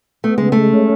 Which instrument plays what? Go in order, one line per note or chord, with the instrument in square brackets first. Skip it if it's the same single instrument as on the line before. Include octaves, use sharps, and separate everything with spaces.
[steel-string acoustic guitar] A3 [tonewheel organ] B3
[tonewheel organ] C#3 [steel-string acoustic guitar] G#3
[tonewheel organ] G#3 [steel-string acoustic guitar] A3
[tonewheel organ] C#4